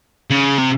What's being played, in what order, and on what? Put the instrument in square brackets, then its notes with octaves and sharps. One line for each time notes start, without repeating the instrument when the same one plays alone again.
[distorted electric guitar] C#3
C3